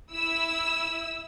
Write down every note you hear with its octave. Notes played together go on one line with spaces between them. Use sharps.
E4 E6